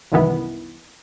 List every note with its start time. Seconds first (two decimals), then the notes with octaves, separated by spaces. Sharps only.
0.12 C2 F#2 D#3 E3 B3